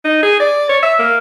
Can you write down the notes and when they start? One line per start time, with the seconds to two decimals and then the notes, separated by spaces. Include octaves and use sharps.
0.05 D#4
0.23 G#4
0.40 D5
0.69 C#5
0.83 E5
0.99 A#3